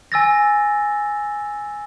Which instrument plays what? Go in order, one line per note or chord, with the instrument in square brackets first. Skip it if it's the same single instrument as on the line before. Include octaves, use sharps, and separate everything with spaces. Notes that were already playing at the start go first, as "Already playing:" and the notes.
[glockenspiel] G#5 E6 A6 A#6